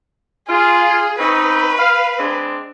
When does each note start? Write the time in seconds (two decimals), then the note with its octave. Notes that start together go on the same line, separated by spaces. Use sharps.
0.49 F4 G#4
1.18 C4 C#4 D#4 B4
1.78 F5
2.18 G#3 C4 D4